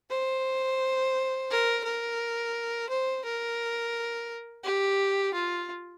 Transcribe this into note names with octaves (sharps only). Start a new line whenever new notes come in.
C5
A#4
A#4
C5
A#4
G4
F4